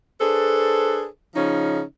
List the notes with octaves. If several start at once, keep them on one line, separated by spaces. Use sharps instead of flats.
D4 G#4 A4 B4 C5
C#3 F3 C#4 D#4